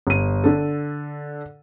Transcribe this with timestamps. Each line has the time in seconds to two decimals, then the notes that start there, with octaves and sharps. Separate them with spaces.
0.07 G1 D#7
0.44 D3 A4